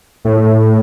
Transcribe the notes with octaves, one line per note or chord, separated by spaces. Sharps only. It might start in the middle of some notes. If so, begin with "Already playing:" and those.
A2